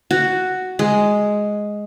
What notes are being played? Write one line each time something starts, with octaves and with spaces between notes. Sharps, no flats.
F#4
G#3